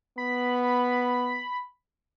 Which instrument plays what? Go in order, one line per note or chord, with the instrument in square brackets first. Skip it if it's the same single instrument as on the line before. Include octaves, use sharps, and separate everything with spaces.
[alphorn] B3 [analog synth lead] B5